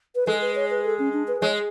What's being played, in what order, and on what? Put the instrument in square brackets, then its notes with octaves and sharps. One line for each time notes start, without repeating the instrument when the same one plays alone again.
[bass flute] B4
[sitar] G#3 [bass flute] A4
[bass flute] B4
C#5
B4
A4
C#4
D4
B4
[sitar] G#3 [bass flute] C#5